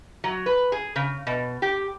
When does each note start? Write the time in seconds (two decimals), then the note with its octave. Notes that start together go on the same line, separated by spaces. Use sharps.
0.24 F#3
0.46 B4
0.72 G#4
0.96 C#3
1.27 B2
1.62 G4